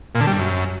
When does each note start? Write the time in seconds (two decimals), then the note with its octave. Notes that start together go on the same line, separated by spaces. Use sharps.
0.15 A#2
0.21 D3
0.27 G3
0.33 G2
0.39 F#2